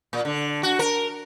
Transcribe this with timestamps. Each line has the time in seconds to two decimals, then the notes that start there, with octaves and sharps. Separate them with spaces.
0.13 A#2
0.25 D3
0.63 F#4
0.79 A#4